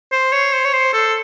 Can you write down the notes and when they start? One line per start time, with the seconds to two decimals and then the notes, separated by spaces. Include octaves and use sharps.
0.12 C5
0.32 C#5
0.53 C5
0.65 C#5
0.74 C5
0.93 A4